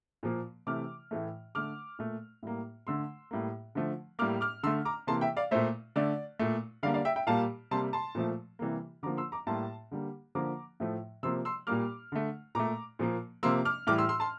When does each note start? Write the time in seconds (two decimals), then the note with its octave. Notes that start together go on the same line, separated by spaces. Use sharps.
0.23 A#2 F3 A#3
0.67 C3 E3 A3 D6 F6
1.11 A2 E3 A3
1.55 D3 A3 D6 F6
1.99 A#2 A3
2.43 A2 G3 A#3
2.87 D3 A3 C6 E6
3.31 A2 G3 A#3
3.75 D3 F3 A3
4.19 A2 G3 A#3 D6 F6
4.41 D6 F6
4.63 D3 C6 E6
4.67 A3
4.85 A#5 D6
5.07 C3 E3 A#3 A5 C6
5.21 E5 G5
5.37 D5 F5
5.51 A#2 A3 C5 E5
5.96 D3 A3 D5
6.39 A#2 A3
6.83 D3 G3 A#3 D5 F5
6.94 D5 F5
7.05 E5 G5
7.16 E5 G5
7.27 A#2 G3 A#3 F5 A5
7.71 C3 G3 A#3 A5 C6
7.93 A5 C6
8.15 A#2 F3 A3
8.59 C3 E3 G3 A#3
9.03 D3 F3 A#3 A#5 D6
9.17 C6 E6
9.32 A#5 D6
9.47 A2 G3 A#3 A5 C6
9.91 D3 G3 A#3
10.35 D3 F3 A#3 A#5 D6
10.80 A2 F3 A3
11.23 C3 F3 A#3 C6 E6
11.45 C6 E6
11.67 A#2 G3 A#3 D6 F6
12.12 D3 A3
12.55 A#2 A3 A#5 D6
12.99 A#2 F3 A#3
13.43 C3 F3 A#3 C6 E6
13.65 D6 F6
13.87 A2 E3 G3 D6 F6
13.98 C6 E6
14.09 C6 E6
14.20 A5 C6